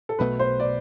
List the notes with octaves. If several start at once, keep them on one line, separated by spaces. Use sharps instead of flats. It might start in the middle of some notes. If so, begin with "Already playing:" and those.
A4
B1 B2 A3 B4
C5
D5